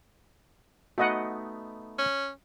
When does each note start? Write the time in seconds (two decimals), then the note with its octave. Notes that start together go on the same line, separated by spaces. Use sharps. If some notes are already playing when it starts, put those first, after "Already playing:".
0.98 A3 B3 D#4 F#4 D#5 F#5
1.98 C#4